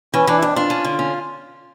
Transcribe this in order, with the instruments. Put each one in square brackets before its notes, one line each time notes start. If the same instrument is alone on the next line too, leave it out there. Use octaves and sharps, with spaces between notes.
[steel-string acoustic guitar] E3 [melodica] C#4
[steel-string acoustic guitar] E3 [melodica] D4
[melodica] E4
[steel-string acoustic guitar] F2 [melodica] D4
[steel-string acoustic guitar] D4 [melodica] F4
[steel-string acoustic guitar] C#4
D3
C#4